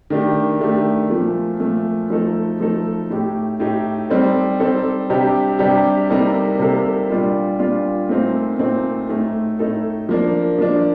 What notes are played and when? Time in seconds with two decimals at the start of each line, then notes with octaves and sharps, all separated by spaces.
0.10 D#3 A3 D4 G4
0.61 D#3 A3 D4 G4
1.10 A#2 F3 A3
1.59 A#2 F3 A3
2.10 F3 A3 D#4 A4
2.60 F3 A3 D#4 A4
3.10 A2 A3 D#4 G4
3.60 A2 A3 D#4 G4
4.10 G3 C4 D#4 A4
4.60 G3 C4 D#4 A4
5.10 C3 G3 D4 G4
5.59 C3 G3 D4 G4
6.10 C3 G3 A#3 D#4 A4
6.59 C3 G3 A#3 D#4 A4
7.09 A#2 G3 D4 F4
7.59 A#2 G3 D4 F4
8.09 A#2 A3 C4 D#4
8.59 A#2 A3 C4 D#4
9.09 A2 A3 D#4 A4
9.59 A2 A3 D#4 A4
10.09 F3 A#3 D4
10.59 F3 A#3 D4